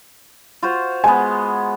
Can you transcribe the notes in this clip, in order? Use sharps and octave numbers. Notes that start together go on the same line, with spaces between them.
F4 F#4 C5
G#3 B3 G#5